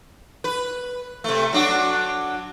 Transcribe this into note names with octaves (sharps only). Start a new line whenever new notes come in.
B4
C3 A3
F#3 D4 F#4